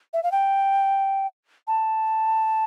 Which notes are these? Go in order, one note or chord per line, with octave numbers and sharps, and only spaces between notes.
E5
F5
G5
A5